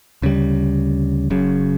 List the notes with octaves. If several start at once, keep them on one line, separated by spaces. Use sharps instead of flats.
D2 C#3 G3
F#1 F#2 C#3